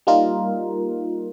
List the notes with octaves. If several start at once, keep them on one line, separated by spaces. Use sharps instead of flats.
G3 A#3 D#4 F4 A#4